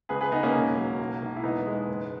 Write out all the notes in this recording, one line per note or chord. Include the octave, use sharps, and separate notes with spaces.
C#2 G#4 B4
G#4 B4
C#2 B3 D#4
A#3 C#4
E1
F#3
B1
B1
E4
E1 B3 D#4
G#3
F#1